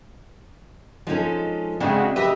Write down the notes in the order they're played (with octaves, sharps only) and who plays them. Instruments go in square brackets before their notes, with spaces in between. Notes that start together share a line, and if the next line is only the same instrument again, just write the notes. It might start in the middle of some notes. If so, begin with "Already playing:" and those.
[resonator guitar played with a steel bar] F3 C#4 [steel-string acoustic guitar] G#3 D#4 A4
[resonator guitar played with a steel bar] C#3 [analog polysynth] G#3 F#4 [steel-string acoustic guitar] C4 D4 E5
[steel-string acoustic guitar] G4 B4 [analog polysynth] D#5 E5